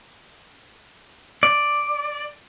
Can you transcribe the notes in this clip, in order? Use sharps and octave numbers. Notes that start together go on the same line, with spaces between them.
D5